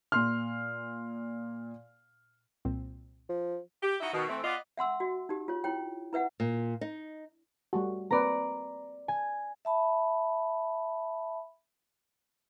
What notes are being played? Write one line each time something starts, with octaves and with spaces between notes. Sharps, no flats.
A#2 C6 F6
C2 A#2 C4
F3
G4
D#4 E4 F#4
B2 D#3
E3 A3 C4
B3 F4 D5 D#5
E5 F#5 C6 E6
F#4
D#4 G4
F4 C#5
E4 C#5 G5
E4 B4 E5 F#5
A#2
D#4
G3 A3 F#4
A#3 C4 B4 D5 A#5
G#5
E5 A5 B5